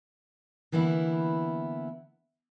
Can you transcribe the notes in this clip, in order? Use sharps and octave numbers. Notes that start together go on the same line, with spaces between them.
D3 E3 A#3 B3 E4